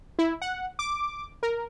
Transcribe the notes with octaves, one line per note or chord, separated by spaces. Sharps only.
E4
F#5
D6
A#4